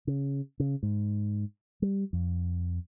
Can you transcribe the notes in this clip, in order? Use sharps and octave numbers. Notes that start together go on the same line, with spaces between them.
C#3
C#3
G#2
G3
F2